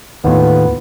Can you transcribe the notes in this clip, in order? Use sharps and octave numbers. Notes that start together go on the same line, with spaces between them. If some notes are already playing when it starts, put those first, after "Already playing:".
D#2 A2 B3 F4